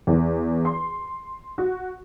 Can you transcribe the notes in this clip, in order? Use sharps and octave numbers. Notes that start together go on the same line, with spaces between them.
E2
C6
F#4